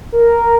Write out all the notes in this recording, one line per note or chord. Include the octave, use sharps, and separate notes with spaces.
A#4